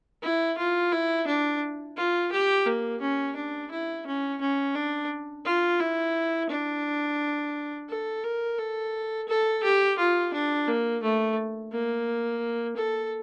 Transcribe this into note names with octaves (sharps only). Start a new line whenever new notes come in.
E4
F4
E4
D4
F4
G4
A#3
C#4
D4
E4
C#4
C#4
D4
F4
E4
D4
A4
A#4
A4
A4
G4
F4
D4
A#3
A3
A#3
A4